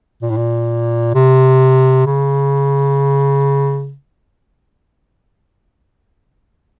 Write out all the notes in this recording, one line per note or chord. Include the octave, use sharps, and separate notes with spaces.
A#2
A2
A#2
C3
C#3